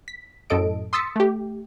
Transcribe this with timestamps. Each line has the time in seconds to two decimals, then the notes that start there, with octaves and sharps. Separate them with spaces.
0.08 B6
0.50 F#2 A2 A4 D#5 D7
0.93 C6 D#6 E6 A6 B6 C#7
1.16 A3 G4